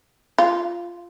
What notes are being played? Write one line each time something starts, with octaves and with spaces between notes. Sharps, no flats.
F4